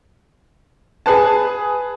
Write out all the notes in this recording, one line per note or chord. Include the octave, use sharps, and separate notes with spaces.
G#4 B4 A5